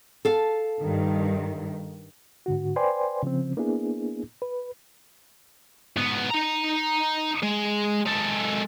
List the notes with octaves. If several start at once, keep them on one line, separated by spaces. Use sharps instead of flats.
A4 F5
G2 D#3
G#2 D3 F#4
B4 C5 D5 G5 G#5 C6
C#3 F3 C4
A#3 B3 D4 E4 G#4
B4
G#2 B3
D#4 A#5
G#3
G#3 A4